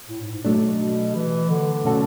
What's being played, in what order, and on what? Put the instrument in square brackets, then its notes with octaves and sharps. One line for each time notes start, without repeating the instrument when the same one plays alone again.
[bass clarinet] A2
G#2
G#2
[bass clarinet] B2 [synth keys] F#3 A3 D4
[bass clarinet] E3
D3
[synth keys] B2 A3 C#4 F#4 A4